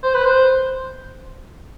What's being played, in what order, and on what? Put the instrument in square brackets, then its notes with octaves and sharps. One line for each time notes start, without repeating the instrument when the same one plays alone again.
[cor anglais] C5
B4
C5